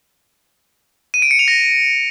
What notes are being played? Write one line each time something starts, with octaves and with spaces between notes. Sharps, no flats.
D#7
D7
C#7
F7
A#6